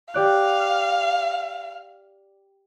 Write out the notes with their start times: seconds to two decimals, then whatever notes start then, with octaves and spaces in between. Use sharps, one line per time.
0.14 G4 D5 F5 F#6